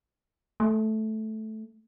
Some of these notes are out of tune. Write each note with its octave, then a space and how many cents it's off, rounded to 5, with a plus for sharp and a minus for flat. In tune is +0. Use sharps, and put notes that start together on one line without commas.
A3 -10